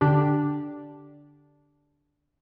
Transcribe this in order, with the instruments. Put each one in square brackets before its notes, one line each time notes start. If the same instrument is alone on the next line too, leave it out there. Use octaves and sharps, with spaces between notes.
[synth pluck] D3 D4 G4